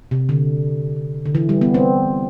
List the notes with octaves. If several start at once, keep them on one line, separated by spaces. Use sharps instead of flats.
C3
D3
D3
E3
G3
B3
C4